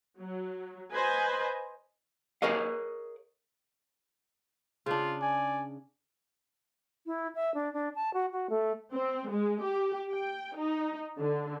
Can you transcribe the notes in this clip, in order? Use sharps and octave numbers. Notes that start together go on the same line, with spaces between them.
F#3
B4 C5 D#5 G#5
G#4 A#4 C#5 D#5 F5
C#3 D4 F4
D5 G#5
E4
E5
D4
D4
A5
F#4
F#4
A3
C4
G#3
G4
G5
D#4
D3